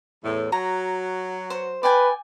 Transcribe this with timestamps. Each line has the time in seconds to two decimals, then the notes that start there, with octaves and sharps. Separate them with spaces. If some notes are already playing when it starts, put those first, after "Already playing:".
0.24 E2 A2
0.52 F#3 F#4 A#5
1.50 C5
1.83 B4 D5 G5 G#5